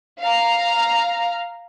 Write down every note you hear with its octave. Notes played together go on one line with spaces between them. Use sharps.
F5 A#5